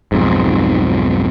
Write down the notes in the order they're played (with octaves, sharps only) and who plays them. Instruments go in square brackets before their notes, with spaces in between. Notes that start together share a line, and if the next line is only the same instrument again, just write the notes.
[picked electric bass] B1 F2 G#2